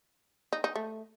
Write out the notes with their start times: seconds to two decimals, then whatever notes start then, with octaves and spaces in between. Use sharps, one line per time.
0.53 D#4
0.64 D#4
0.76 A3